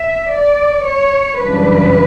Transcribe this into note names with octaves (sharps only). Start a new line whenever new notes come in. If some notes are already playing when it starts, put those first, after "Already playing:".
Already playing: E5
D5
C#5
F#2 C#3 E3 G3 D4 B4